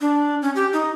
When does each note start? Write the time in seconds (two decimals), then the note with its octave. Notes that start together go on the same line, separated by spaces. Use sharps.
0.01 D4
0.42 C#4
0.56 G4
0.73 D#4